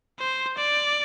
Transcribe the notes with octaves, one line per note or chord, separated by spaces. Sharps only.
C5
D5